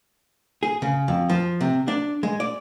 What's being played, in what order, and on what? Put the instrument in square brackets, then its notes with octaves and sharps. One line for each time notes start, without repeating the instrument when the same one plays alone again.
[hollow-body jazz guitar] G#4
C#3
F2
F3
C3
D4
G#3
D5